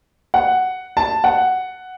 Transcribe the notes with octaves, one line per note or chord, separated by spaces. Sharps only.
F#5
A5
F#5